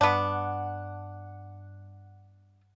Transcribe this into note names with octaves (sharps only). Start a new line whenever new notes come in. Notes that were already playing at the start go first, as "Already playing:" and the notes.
G2 B3 D4 F#5